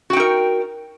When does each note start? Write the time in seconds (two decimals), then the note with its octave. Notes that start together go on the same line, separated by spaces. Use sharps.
0.10 F#4
0.13 G5
0.16 D#4
0.20 A#4